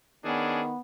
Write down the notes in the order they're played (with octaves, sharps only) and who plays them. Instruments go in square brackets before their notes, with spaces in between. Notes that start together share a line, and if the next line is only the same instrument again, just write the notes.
[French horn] D#3 [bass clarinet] B3 [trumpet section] C#4 D4 G#4